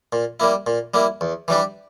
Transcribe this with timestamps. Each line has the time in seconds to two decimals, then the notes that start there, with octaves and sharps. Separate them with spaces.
0.13 A#2
0.40 G3 A#3 E4
0.67 A#2
0.94 G3 A#3 E4
1.21 E2
1.48 E3 G3 D4 G4